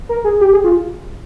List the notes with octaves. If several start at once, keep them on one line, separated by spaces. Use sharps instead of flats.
A#4
G#4
G4
G#4
F4